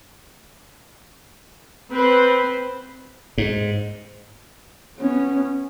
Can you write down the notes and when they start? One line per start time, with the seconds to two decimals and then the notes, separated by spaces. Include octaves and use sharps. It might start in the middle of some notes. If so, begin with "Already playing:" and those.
1.92 C4 B4 C5
3.38 G#2
4.97 B3 C#4